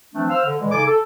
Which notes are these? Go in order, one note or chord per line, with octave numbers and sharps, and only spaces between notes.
E3 F3 A3 C4 D4
C5 F5 E6 F6
D3
A#2 E3 G3 G#3
C#3 D#4 A4 G#5 D6
A4